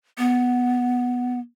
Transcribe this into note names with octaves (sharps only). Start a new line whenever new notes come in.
B3